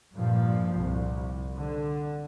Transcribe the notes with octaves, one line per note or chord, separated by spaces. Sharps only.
G2 A#2 F3
C2
D3